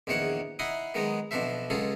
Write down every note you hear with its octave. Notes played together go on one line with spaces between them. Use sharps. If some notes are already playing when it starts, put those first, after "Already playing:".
A#1 E2 D#3 C5 C#5 F#5
D#4 E4 F#5 C6 D#6
D#3 F#3 G#3 B3 D#4
B1 B2 F3 D4 C5 E5
C#2 F#3 F4 G#4 A4